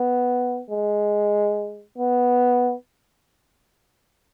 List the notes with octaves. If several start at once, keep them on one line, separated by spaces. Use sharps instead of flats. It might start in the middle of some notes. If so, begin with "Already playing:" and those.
Already playing: B3
G#3
B3